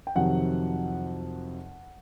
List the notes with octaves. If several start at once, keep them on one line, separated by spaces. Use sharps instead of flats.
G5
F2 C3 D#3 F#3 F#5